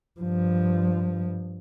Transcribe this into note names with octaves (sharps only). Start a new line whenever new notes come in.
G2 F3